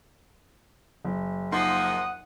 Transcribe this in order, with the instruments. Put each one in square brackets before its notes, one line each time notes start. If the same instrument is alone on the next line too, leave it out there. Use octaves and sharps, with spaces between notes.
[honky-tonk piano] F#1
[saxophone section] F3 A#3 [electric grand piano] D#4 C6 [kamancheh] F#5 D#6